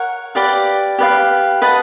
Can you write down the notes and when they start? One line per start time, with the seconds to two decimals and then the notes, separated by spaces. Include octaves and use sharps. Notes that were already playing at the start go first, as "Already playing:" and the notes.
Already playing: A#4 C#5 F#5
0.35 G4 B4 D5 F5
0.99 G4 B4 D5 F5
1.62 B4 D#5 F#5 A5